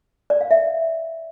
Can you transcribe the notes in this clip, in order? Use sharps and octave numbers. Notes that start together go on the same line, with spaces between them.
D5
F5
E5